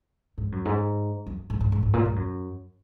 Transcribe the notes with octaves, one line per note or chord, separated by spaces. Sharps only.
G#2
F#2
G#2
F#2
G#2
G#2
G#2
G#2
A#2
G#2
F#2